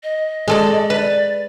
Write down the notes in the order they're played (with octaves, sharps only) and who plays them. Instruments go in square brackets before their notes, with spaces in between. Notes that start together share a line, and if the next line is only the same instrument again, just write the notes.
[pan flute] D#5
[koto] G#3 A4 D5
[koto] B4 [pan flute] D5